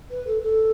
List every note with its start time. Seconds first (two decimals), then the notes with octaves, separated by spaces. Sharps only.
0.10 B4
0.27 A4
0.42 A4